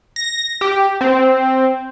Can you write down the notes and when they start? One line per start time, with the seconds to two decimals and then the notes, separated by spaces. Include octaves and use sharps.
0.16 A#6
0.61 G4
1.01 C4